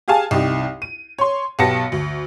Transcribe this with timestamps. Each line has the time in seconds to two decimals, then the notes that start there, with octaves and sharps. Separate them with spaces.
0.08 G4 G#4 F5 G#5 A5
0.31 C2 D#4 G4
0.82 D#7
1.18 C#5 C6
1.59 B1 B3 G4 A5 A#6 C#7
1.92 D2